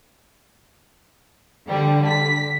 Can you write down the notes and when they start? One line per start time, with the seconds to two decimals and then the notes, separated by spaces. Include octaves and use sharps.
1.65 D3 G3
2.07 B6